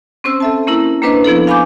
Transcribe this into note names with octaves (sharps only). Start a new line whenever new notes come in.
C4 C#4 C5 E6
A4 E5 A5
A#3 C#4 E4 A#4
A#3 D4 B4 C5 D#5
F3 B3 E4 A4
F5 G#5 B5 C#6 D6 G6